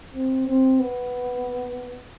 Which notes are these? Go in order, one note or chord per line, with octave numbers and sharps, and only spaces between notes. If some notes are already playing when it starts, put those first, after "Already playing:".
C4
C4
B3